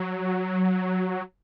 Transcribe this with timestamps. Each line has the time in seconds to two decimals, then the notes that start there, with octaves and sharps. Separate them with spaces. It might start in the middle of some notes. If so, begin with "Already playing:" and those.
Already playing: F#3